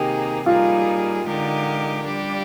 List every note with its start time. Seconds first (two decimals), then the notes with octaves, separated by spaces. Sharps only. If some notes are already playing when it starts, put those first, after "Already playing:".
Already playing: C3 D#3 A#3 D#4 G4 G#4
0.46 G3 A#3 D#4 F4 G#4
1.26 D3 G#3 D#4 G4 A#4
2.05 G3 D4 G4